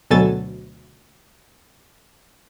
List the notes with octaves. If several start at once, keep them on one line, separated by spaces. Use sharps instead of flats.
D2 B2 F#3 A4 G#5 A6